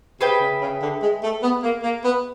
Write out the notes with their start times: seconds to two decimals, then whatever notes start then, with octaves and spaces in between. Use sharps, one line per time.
0.20 C3 G#4 B4 E5 G5
0.41 C#3
0.61 C#3
0.82 D3
1.02 G#3
1.23 A3
1.43 B3
1.63 A#3
1.83 A#3
2.04 B3